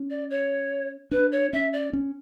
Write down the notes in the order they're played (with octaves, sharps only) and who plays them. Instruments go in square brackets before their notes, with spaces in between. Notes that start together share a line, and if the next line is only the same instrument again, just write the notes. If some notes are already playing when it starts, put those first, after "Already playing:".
Already playing: [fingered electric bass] C#4
[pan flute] D5
C#5
[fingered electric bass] D4 [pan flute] B4
[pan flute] C#5
[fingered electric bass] C#4 [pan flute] E5
[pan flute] D5
[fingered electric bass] C#4